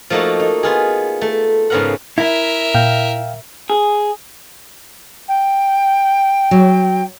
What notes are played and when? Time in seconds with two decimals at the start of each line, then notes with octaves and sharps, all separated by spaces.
0.10 F3 A3 A#3 D#4 F#4 A4
0.40 D#4
0.63 B3 F4 G#4
1.22 A3
1.70 G#2 C#3 B3 A#4 F5 F#5
2.18 E4 A#4 E5
2.75 A#2 F5 G5
3.70 G#4
5.28 G5
6.51 F#3